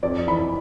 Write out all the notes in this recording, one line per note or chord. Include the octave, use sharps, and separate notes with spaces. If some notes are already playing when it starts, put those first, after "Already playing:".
F2 D5
E3 B5